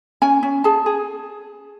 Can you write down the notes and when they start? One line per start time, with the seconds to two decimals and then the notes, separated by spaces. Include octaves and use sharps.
0.22 C#4 G#5
0.43 C#4
0.64 G#4 A5
0.86 G#4